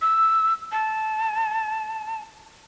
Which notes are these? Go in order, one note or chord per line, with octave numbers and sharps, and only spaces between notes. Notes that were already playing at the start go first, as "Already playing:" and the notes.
E6
A5